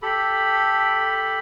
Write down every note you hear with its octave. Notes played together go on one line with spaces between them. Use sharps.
G4 A4 B5